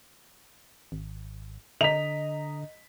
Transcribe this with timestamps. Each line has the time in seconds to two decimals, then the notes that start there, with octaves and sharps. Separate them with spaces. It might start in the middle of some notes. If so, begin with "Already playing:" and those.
0.92 G#1
1.81 D3 D#5 A#5 B6 F7